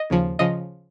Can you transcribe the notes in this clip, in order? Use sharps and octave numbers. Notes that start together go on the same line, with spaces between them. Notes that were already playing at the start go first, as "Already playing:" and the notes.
Already playing: D#5
D#2 C#3 F3
C#3 F3 D#5